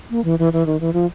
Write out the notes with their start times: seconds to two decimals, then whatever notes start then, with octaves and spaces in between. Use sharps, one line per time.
0.11 A#3
0.24 E3
0.39 E3
0.53 E3
0.66 D#3
0.80 E3
0.93 F3